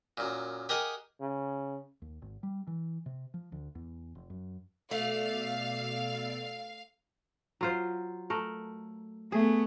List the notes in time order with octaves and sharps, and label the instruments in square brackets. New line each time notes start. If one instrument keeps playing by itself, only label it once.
[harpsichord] F#2 A#2
G4 G#4 A#4 D#5 F#5
[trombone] C#3
[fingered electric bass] D#2
G#1
G3
E3
C3
F3
D2
E2
F1
F#2
[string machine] B2 D5 E6 [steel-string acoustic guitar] A3 [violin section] F5
[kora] F#3 F4 C5
A3 A#4
[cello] A3 B3 [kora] G#4